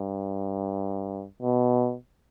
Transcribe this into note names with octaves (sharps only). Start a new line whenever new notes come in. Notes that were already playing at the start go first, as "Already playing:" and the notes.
Already playing: G2
B2